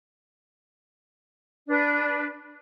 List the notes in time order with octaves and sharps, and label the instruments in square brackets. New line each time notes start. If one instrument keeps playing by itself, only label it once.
[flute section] D4 B4